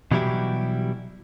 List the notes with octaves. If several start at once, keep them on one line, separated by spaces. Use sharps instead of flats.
B2 E3 F#3 G3 E4 G4